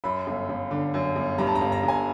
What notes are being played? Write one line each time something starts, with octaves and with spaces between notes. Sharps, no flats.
F#2 B5
G1
G1
D3
F#2
G1
G2 A#5
A5
A#5
G1
A#5
G1
G#5